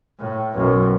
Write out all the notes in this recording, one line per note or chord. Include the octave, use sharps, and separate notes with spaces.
A2
B1 F#2